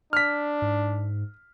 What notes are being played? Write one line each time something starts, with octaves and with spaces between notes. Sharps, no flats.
D4 F6 B6
G#2